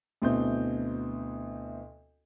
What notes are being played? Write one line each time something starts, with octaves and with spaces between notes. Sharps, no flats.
D2 B2 C4 E4 G6